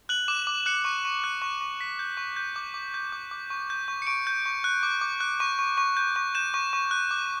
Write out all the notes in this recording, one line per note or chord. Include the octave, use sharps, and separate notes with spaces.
F#6 F#7
D6 E7
D6
F#6 C#7
C#6
C#6
F#6
C#6
C#6
C#6 B6
G6
C#6
G6
D6
D6
G6
D6
D6
C#6
G6
C#6
C#7
C#6 D7
G6
C#6
F#6
D6
D6
F#6
C#6
C#6
C#6
G6
C#6
G6 E7
C#6
C#6
F#6
D6